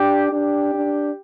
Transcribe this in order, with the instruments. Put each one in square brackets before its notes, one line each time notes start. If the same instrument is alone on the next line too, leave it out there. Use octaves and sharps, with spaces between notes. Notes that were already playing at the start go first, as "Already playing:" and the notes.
Already playing: [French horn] D4 [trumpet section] G4
[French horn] D4 [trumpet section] G4
[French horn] D4